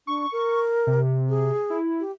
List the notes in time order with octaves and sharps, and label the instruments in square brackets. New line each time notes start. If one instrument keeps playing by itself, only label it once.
[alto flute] D4 [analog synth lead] C#6
[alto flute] A#4
[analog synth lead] C3
[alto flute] G#4
[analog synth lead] E4
[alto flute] G4